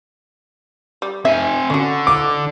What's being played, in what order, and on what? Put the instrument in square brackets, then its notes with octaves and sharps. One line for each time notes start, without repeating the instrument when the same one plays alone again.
[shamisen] G3
[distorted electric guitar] C4 G#5 [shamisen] E5
[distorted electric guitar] D3 [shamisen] C#4 F#4
[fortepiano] D6